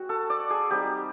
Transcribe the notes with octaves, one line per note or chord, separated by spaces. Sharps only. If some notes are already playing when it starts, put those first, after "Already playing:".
Already playing: G#3 C4 F#4
A4
D5
G#4
G3 C4 D#4 G4